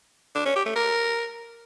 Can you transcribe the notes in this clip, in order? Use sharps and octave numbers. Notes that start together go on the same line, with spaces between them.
D4
C#4
G4
A3
A#4